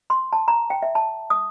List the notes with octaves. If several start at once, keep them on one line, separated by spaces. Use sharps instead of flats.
C6
A5
A#5
G5
E5
A5
D#6